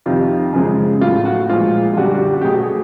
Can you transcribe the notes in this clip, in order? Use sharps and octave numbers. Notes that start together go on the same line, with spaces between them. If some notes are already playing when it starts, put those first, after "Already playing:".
F2 C3 D#3 F4
F#2 C#3 F3 G#3
A2 F#3 A3 F4
F#4
A#2 F3 G#3 F4
F4
F#2 D3 G3 F#4
F#4
G4
F#4
G4
B2 F#3 A3 G#4
G#4